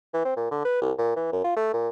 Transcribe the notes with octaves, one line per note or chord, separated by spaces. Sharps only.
E3
C4
A#2
D3
B4
C2
A#2
E3
F#2
F4
A3
A#2